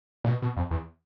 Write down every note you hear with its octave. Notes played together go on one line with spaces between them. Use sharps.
A#2
B2
B2
F2
E2